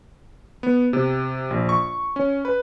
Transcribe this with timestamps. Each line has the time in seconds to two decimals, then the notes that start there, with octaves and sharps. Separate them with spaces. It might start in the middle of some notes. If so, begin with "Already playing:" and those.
0.63 B3
0.93 C3
1.50 A#1
1.69 C#6
2.16 C#4
2.45 B4